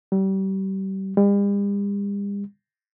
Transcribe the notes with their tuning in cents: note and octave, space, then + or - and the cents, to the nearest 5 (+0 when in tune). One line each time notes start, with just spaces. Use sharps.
G3 -30
G3 +45